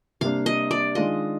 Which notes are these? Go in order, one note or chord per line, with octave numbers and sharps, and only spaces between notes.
C3 G3 A#3 D4 F5
D#5
D5
D#3 G#3 D4 F4 D#5